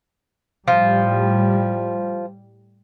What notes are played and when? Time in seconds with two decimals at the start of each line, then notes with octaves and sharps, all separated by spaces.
0.68 A2 F3 G3